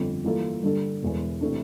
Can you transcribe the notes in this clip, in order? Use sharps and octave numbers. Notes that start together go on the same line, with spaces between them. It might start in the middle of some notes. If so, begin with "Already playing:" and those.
Already playing: G1 F2 D3 F3
G2 E3 A#3 F4 A4
G2 D3 G3 D4 A4
E1 E2 E3
C3 E3 A3 D4